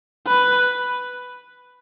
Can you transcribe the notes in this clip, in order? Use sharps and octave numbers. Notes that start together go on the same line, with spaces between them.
B4